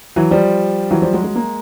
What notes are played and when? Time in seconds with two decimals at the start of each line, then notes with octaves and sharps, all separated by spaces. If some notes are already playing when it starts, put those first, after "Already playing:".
0.16 E3 F#3
0.31 F3 G3
0.91 E3 F#3
1.02 F3 G3
1.13 F#3 G#3
1.24 F#3 G#3
1.35 G#3 A#3